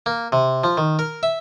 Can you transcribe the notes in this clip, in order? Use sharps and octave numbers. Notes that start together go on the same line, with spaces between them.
A#3
C3
F3
D#3
A#4
E5